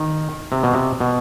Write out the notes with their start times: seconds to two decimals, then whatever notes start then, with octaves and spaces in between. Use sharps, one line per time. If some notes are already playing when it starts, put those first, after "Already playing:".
Already playing: D#3
0.52 C3
0.63 B2
0.73 C3
1.00 B2